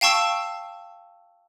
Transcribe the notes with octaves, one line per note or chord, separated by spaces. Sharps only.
F5 G5 A5 C#6 E6